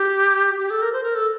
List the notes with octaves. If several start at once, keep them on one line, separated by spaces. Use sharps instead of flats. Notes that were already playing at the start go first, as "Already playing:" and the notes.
Already playing: G4
G4
A4
A#4
C5
A#4
A4